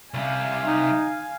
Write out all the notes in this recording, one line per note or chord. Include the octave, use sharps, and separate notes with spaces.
C2 C3 F5 G#5
D#4